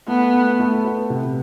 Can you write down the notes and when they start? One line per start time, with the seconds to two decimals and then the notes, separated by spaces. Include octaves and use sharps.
0.08 A3 B3
0.34 A3
0.60 A3
0.85 B4
1.10 C3